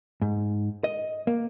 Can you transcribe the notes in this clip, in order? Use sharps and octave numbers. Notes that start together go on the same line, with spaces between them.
G#2
D#5
A#3